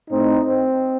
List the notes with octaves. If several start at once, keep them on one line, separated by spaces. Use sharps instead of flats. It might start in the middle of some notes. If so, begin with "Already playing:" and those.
A2 A3 C4 D#4
C4